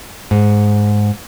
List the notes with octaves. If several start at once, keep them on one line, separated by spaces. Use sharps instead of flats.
G#2